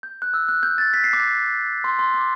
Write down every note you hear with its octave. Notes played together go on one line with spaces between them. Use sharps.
G6
F#6
E6
F#6
G6
A6
B6
C7
D6
C6
C6
D6